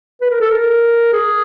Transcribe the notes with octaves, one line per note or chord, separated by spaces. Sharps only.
B4
A#4
A4
A#4
G#4